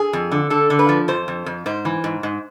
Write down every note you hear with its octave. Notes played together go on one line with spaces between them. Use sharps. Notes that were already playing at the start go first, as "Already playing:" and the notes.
Already playing: G#4
F2
D3
D3 A4
D3
B4
F3
F2 C5
F2
F2
G#2 C5
E3
G#2
G#2